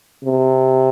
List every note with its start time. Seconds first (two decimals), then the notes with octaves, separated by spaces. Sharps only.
0.25 C3